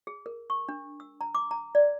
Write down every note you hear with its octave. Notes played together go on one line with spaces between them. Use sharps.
G#4
A#4
C#6
D4
E6
A#5
D6
A#5
D5